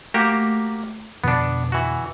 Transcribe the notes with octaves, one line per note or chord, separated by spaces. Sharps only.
A3 A#3 F#4 G4
F2 B2 D3 B3 D4
E3 F#4